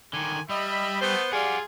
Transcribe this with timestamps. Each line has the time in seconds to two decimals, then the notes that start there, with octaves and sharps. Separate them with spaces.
0.13 D3 D#3 G#5
0.49 G3 D#5 E5 B5
1.01 A3 B3 C5
1.33 G3 F4 G#4 D5 F5 F#5 G#5